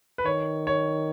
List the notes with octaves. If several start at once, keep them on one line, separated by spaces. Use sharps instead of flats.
B4
D#3 C#5
C#5